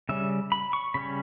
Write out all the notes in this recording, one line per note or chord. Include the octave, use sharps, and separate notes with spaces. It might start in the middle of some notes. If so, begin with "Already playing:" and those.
C#3 G3 C#4 E5
B5
C#6
C#3 G3 C#4 B5